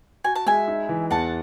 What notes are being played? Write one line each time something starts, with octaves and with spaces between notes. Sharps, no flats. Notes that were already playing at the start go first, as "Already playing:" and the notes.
F#4 G#5
A5
G#3 E5 G#5
D#4
E3
E2 F#5 A5